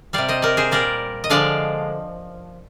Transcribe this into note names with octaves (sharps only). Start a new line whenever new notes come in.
C3 G3 D5 F5
C5 D#5
A#4 D5
G#4 C5
A#2 G3 A#4 D5
D#5
D3 F3 G#3 D5 F5